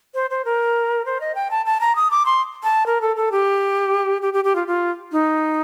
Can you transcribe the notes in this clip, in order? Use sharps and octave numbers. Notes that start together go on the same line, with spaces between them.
C5
C5
A#4
C5
D#5
G5
A5
A5
A#5
D#6
D6
C6
A5
A#4
A4
A4
G4
G4
G4
G4
F4
F4
D#4